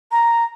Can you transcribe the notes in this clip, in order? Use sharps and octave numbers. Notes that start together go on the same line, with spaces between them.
A#5